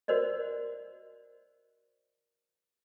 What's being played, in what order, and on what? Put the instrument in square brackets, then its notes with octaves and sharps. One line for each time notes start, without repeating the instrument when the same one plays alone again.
[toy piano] F#4 A#4 C5 D5 D#5